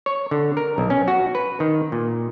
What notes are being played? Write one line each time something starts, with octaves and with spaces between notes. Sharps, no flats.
C#5
D3
A#4
B1
C#4
F#4
B4
D#3
A#2